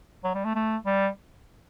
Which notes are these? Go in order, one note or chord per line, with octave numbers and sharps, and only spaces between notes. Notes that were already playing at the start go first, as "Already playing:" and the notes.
F#3
G3
A3
A3
G3